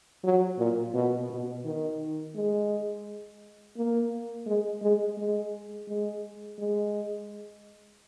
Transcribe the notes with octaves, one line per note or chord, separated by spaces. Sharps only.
F#3
A#2
B2
B2
D#3
G#3
A#3
G#3
G#3
G#3
G#3
G#3